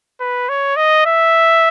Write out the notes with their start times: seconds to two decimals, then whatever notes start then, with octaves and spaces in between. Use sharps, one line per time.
0.20 B4
0.49 C#5
0.77 D#5
1.06 E5